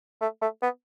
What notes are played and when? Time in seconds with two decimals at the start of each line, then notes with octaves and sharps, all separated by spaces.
0.21 A3
0.41 A3
0.62 B3